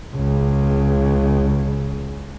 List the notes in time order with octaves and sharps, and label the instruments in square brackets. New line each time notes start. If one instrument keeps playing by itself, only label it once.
[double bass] C#2 C#3